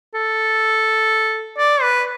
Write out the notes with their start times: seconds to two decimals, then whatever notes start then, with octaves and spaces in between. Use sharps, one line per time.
0.14 A4
1.58 D5
1.82 B4